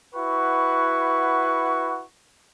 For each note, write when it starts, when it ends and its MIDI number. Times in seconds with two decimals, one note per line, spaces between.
0.15 2.04 64
0.15 2.04 66
0.15 2.04 71
0.15 2.04 78
0.15 2.04 85